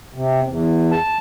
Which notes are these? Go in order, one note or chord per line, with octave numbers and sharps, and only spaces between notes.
C3
E2
A5